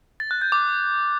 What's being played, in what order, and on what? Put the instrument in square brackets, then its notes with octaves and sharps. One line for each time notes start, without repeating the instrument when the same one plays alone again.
[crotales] A6
F#6
G6
D6